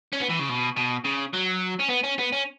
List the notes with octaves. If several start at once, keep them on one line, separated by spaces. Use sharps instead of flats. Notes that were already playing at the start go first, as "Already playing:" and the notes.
C#4
B3
E3
C#3
B2
B2
C#3
F#3
C#4
B3
C#4
B3
C#4